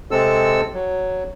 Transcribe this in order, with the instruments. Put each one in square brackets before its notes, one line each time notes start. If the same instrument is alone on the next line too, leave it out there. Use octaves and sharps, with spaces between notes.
[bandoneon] C3 G#3 C4 A4 E6
F#3